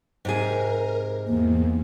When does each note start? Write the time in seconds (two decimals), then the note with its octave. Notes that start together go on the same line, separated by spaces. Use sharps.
0.25 G#2 C3 G#4 A#4
1.27 E2 A#3